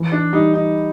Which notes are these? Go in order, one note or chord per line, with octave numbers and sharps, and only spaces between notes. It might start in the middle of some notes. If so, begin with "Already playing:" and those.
Already playing: E3
D4
G3 D#4
D#4